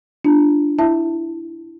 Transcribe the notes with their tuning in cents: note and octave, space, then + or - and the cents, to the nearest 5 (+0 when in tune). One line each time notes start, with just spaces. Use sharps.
D4 +0 F4 -25
E4 +10 E5 +0 A5 +20